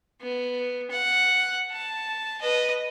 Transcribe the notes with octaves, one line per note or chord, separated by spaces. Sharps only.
B3
F#5
A5
B4 D#5